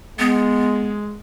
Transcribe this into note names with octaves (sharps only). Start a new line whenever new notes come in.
G#3 B3